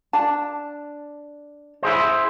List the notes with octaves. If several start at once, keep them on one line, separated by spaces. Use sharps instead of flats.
D4 A5
E4 G#4 C5